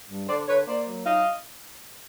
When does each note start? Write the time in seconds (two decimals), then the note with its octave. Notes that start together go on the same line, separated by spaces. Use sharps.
0.10 G2
0.28 D3 C5 D5
0.48 D3 B4 C#5
0.67 A#3 C5 D5
0.87 F#3
1.06 D#4 D#5 F5